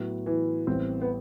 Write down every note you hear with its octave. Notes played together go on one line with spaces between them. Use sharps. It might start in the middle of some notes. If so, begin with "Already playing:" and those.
Already playing: A2 F#3 B3 F#4
E3
A1 A2 G3 B3 C4
B3